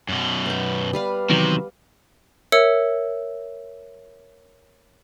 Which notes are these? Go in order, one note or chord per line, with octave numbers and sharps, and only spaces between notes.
F#2 B2
B3 G5
G3 B4 F5
E2 C3 D#3 F#3
A#4 C#5 E5 E6 C#7